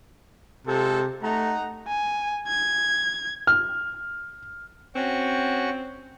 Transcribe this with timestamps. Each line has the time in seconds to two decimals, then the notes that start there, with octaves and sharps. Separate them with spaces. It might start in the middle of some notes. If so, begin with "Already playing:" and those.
0.67 C3 G#3 F4 A4
1.23 A3 D#4 F#5 A#5
1.88 G#5
2.48 G#6
3.47 F6
4.95 C4 C#4 F#4 C#6